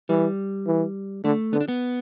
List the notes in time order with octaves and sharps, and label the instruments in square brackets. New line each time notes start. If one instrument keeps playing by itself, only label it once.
[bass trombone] E3 [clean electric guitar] G3
[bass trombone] E3
[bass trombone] D3 [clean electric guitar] A3
[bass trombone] D3 [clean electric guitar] B3
[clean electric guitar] D4
B3